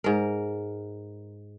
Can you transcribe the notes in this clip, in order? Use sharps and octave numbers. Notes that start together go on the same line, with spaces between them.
G#2 A#4